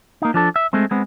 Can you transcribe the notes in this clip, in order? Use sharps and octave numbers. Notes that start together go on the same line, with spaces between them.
A#3 D#4
F3 D4 A4
E5
G#3 A3 C4
G#3 B3 C4